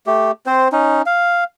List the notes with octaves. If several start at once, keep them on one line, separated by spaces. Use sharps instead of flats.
A3 G4
C4 C5
C#4 D#4
F5